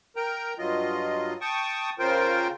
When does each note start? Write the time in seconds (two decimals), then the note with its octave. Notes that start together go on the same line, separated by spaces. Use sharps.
0.16 A#4 G5 A#5
0.58 G2 F#3 F4 D#5
1.41 G5 A5 C#6 D#6
1.99 C#3 F4 A#4 C5 G5